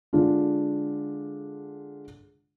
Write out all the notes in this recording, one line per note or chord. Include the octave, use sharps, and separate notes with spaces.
D3 G#3 D4 F4